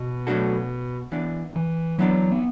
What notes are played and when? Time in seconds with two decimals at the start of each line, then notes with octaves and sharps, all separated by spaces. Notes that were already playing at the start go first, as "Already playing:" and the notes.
Already playing: B2
0.27 F#3 A3 D4 F#4 A4
1.12 E3 B3 D4
1.56 E3
1.98 E3 F#3 B3 D4
2.31 B3